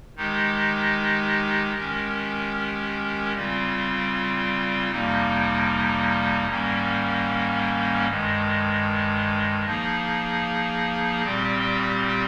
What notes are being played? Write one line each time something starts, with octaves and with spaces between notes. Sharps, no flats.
D#3 G#3 D#4 G4
D#3 G#3 C#4 G4 A#4
C#3 G3 C4 F4
F2 C3 G3 A#3 D#4
G#2 D#3 G3 A#3 C#4
G2 D#3 G#3
F3 A#3 D#4 G#4
A#2 G3 C4 G4